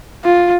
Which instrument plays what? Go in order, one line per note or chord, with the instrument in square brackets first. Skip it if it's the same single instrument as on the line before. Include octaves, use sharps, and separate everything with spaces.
[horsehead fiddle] F4